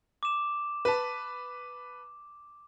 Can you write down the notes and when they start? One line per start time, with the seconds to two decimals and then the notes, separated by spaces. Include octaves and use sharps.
0.23 D6 E7
0.85 B4 A5